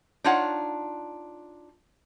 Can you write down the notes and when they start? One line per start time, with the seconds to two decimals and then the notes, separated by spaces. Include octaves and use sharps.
0.24 D4 D#4 F4 C#5 F#5